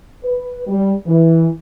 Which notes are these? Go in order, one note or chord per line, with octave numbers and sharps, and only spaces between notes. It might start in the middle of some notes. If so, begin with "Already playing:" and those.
B4
G3
E3